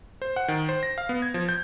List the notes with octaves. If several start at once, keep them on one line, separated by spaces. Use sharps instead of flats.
C5
F#5
D#3
C5
A#6
F5
B3
G#6
F3
G6